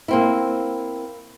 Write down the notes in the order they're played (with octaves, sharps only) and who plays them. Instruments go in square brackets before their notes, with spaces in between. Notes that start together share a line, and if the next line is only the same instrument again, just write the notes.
[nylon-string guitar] A#3 C4 E4